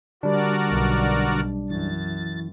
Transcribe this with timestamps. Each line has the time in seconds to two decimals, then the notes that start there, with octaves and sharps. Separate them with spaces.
0.23 D3 G3 D4 F#4 A#4 D5
0.69 B1
1.70 F#2 E3 A6